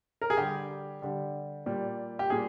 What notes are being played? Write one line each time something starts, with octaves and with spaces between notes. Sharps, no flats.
A#4
G#4
D3 G3 G4
D3 G3
A#2 G3
G4
A#2 G3 G#4